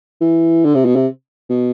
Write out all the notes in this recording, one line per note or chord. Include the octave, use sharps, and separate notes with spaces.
E3
D3
C3
B2
C3
B2